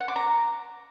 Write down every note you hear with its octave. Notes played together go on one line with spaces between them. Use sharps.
F#5
D6
A#5